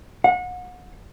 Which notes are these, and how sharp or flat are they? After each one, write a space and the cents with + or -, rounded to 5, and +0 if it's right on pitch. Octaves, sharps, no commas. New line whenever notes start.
F#5 -35